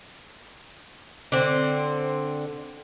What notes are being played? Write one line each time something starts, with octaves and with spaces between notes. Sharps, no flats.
D3 C4